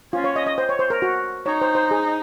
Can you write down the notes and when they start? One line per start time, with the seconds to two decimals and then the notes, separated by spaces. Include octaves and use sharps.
0.13 C#4 F4
0.24 C#5
0.36 D#5
0.46 D#5
0.58 C5
0.69 C#5
0.79 C5
0.90 A#4
1.02 F#4
1.46 D#4 C#5
1.61 C5
1.75 C5
1.91 G#4